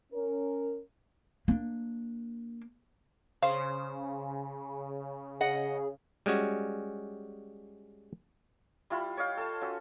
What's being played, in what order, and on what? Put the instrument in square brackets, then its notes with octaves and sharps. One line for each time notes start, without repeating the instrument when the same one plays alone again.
[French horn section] C#4 A#4
[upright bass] A#3 D4
[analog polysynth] C#3 [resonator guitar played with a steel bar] C5 [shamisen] F5
[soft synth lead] G#4 [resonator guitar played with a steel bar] D#5 F#5
[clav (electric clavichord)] G3 G#3 C#4 F#4
[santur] G3 E4 F4
C#5 D#5 F5 G5
A4 A5
C#4 F#4 E6